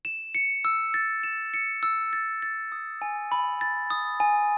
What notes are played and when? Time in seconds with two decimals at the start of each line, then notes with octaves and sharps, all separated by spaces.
0.05 E7
0.35 C#7
0.65 E6
0.94 A6
1.23 E7
1.54 C#7
1.83 E6
2.13 A6
2.42 A6
2.72 D#6
3.02 G#5
3.32 B5
3.61 A6
3.90 D#6
4.20 G#5